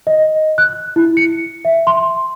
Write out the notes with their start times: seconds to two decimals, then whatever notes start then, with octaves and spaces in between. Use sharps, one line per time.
0.07 D#5
0.58 F#6
0.96 E4
1.17 C#7
1.65 E5
1.87 C6